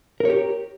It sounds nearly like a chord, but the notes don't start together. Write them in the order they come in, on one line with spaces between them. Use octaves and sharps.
A#4 C#5 G4